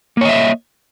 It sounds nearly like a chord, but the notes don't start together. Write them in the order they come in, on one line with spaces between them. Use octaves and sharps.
A#3 C#5 D#5 E5